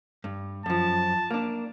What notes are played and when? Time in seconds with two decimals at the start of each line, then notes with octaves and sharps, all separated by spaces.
0.24 G2
0.66 F#2 F3 A5
1.30 A#3 D4